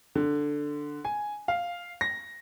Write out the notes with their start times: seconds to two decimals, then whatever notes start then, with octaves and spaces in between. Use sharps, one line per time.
0.15 D3
1.05 G#5
1.48 F5
2.01 A#6